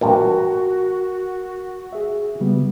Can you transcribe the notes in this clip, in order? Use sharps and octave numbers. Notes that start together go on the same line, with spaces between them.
A1 G2 A#2 F#4 A#4
G#4 E5
C#3 G3 B3